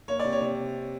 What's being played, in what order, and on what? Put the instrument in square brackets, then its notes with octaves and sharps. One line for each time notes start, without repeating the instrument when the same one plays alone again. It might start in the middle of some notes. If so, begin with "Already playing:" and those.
[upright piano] A#3 C#5
C3 D5
C#5
C3